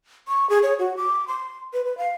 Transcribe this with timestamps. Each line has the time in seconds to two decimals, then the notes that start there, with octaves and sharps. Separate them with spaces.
0.28 C#6
0.50 G#4
0.63 C#5
0.79 F#4
0.97 D6
1.28 C6
1.73 B4
1.85 B4
1.98 F5